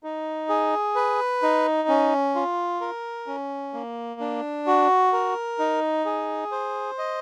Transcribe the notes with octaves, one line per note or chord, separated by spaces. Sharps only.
D#4
G#4
B4
D#4
C#4
F4
A#4
C#4
A#3
D4
F#4
A#4
D#4
G#4
C5
D#5